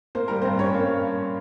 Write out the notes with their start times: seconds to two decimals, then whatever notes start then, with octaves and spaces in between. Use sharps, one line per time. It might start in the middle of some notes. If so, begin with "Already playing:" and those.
0.15 A#3 C5
0.28 G3 A#4
0.42 G2 C4 C5
0.59 G3 C#4 C#5
0.74 A#3